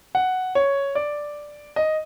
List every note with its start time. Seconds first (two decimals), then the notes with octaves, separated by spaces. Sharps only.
0.15 F#5
0.55 C#5
0.95 D5
1.76 D#5